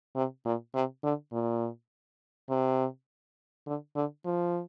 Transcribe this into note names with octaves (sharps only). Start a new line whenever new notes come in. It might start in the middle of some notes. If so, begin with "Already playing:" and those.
C3
A#2
C3
D3
A#2
C3
D3
D3
F3